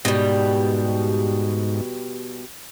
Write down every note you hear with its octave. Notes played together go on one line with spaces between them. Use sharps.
G#2 B2 G3